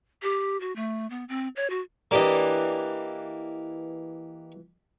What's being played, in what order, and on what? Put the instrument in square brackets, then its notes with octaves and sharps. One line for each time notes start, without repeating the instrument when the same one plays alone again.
[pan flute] G4
F#4
A3
B3
C4
C#5
F#4
[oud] E3 D4 [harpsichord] A#3 G4 D#5